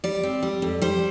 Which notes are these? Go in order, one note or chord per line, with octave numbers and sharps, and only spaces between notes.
G3 D5
C4
G3
F2
G3 C5